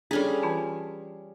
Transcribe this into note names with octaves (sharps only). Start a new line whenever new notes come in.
G3 C#4 D4 G#4 A4
E3 F4 A5